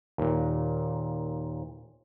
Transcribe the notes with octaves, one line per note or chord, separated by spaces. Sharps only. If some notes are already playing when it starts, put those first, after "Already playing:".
D#2 A#2